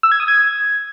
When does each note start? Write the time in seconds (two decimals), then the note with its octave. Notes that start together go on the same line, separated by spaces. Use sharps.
0.03 E6
0.12 G#6
0.20 D#6
0.28 G#6